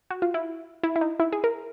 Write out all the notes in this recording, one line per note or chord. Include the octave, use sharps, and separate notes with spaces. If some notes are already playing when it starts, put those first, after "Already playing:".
F#4
F4
E4
E4
E4
D#4
E4
G#4
A#4